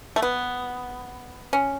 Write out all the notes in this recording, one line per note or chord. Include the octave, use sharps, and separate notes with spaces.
A3
B3
C#4